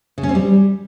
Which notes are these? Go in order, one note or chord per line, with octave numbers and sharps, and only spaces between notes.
C#3
C#4
C4
G3